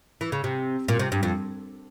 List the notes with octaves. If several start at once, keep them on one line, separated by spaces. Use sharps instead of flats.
E3
C#3
C3
A#2
C3
G2
F2